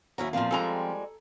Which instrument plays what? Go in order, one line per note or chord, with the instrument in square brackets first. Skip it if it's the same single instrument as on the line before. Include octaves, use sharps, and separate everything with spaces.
[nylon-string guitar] D#2 D#4 [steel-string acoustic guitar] F#3 C#4 E4
[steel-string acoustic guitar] E2 A#2 [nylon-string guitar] F3 C4 F5
[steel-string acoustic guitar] F2 G3 G#3 [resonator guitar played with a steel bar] A4 G#5 A#5